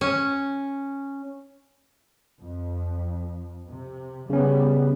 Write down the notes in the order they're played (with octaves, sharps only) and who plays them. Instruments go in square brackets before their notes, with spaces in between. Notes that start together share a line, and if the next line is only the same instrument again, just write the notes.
[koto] C#4
[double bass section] F2
C3
[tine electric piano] C#3 C#4 [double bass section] G3 B3